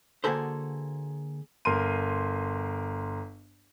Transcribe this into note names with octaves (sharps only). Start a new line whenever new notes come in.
D3 A#3 F#4 G#4 A4 C5
G1 A#4 C6 D#7